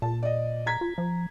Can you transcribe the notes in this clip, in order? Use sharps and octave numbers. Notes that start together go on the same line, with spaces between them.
A#2 A5
D5 D#5
A#5 G#6 B6
F4
F3